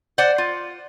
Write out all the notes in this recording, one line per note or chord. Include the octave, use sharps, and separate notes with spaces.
C5 D5 F#5
F4